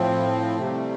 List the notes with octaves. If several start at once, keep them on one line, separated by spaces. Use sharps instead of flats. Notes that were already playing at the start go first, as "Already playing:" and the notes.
Already playing: A2 F3 C4
C3 G3 A3